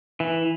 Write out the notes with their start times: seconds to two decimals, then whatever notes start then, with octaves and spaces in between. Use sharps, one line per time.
0.20 E3